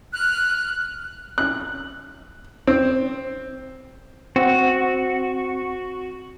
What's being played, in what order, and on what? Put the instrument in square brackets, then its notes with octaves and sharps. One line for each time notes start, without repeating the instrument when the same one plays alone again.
[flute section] F6 F#6
[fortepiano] F#6
C4
[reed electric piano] C4 F#5 [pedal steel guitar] F#4